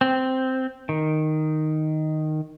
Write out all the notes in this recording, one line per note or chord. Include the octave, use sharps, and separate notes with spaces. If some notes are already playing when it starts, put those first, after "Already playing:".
C4
D#3